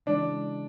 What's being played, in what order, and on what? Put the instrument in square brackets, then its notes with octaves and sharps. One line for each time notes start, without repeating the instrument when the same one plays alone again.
[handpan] C#3 E3 G#3 [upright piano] D4